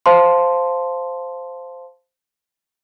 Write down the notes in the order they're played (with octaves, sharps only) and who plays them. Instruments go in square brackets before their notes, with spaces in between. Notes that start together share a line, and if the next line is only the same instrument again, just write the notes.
[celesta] C5 F5 A5 C6